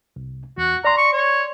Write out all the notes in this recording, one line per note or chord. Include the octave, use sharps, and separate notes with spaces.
C2
E2 F#4
D5 A#5 C6
C#6
C#5